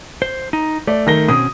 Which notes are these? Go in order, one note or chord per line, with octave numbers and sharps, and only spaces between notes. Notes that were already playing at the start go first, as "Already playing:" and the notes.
C5
D#4
A3 D5
D#3 A#6 G7
B2 C4 C#4 D#6